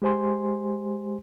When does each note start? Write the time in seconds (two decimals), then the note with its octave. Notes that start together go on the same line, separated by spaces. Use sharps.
0.02 G#3 G4 C5 G#5 C6